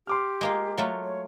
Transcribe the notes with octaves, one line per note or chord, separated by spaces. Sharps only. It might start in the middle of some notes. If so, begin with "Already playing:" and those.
G4 C6 D6 F6
G#3 A#3 F4
F#3 A3 F4
C#5